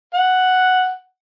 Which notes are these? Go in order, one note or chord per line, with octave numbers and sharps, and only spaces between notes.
F#5